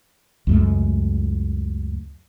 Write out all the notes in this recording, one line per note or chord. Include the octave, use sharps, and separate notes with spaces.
C#2 F#2 A3